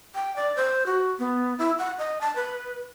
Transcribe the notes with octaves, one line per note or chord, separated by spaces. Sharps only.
G5
D5
C5
F#4
B3
E4
F#5
D#5
A5
B4